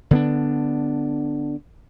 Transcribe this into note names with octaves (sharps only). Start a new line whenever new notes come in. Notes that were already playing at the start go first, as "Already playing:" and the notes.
D3 B3 D4